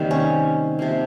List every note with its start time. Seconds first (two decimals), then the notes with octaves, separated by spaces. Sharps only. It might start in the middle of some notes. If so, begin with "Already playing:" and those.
Already playing: C3 D#3 G3 A#3
0.11 C#4
0.79 C3 F3 A#3